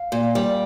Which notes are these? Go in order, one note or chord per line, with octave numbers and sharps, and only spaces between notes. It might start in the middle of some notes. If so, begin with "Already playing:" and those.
Already playing: F5
A#2
G3